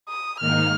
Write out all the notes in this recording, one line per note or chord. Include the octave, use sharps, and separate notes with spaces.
D#6
G#2 D#3 A#3 D#4 F6